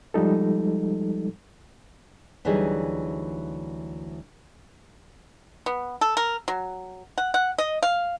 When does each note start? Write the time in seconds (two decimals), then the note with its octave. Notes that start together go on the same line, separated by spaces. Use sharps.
0.14 F3 G3 G#3 D#4 A4
2.45 D2 E3 F#3 G3 D#4 G#4
5.66 B3
6.01 A4
6.17 A#4
6.48 F#3
7.18 F#5
7.34 F#5
7.58 D#5
7.83 F5